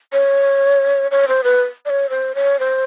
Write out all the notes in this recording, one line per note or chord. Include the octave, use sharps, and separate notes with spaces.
C#5
C#5
C5
B4
D5
C#5
C5
C#5
C5